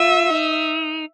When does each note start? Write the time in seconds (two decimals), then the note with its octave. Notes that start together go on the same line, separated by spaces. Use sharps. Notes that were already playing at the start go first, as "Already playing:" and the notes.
Already playing: F4 E5
0.30 D#4